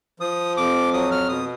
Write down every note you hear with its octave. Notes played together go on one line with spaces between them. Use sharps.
F3 D#6
F2 D6
F#3 D#6
F6
B2 D#6